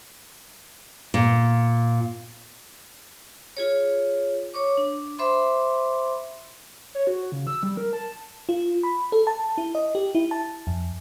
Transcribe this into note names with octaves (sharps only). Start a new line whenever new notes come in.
A#2
F4 G#4 C#5
C#5 C#6 D6
D4
C5 E5 B5 C6 D6
C#5
F#4
C#3
E6
G3
A#4
A5
F4
B5
A4
A5
E4
D#5
G4
E4
A5
F2